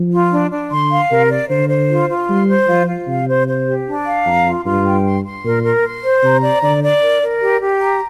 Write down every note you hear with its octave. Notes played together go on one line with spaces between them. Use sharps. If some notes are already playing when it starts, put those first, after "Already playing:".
Already playing: F3
F4
D4
D4
D3 C6
F5
C3 A#4
D5
D3 C5
C5
F4
F4
G3 C6
C5
F3 F4
F4
C3 F5
C5
C5
G4
D4
F5
F2 A#5
F4
G2 F4
G5
C6
C6
A#2 A#4
A#4
C6
C5
C3 A#5
D5
D3 D5
D5
A#4
A#4
G4
G4
A#5